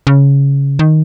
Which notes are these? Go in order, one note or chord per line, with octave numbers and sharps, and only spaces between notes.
C#3
D#3